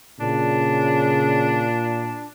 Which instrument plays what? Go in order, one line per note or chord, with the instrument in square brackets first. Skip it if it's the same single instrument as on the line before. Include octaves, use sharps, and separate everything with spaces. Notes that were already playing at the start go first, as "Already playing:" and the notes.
[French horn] A#2 [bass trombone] C#3 [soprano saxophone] D4